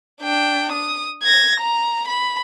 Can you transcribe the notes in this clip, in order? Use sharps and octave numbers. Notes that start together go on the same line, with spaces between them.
D4 G5
D#6
G#6 A#6
A#5
B5